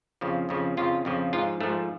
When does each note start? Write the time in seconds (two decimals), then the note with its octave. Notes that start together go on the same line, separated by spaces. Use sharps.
0.21 F2 C#3 F3
0.49 F2 C#3 F3
0.77 F2 C#3 F3 F4
1.05 F2 C#3 F3
1.33 G#2 F3 F4
1.61 G#2 F3 A3